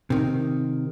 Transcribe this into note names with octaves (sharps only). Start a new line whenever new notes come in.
C3 D#3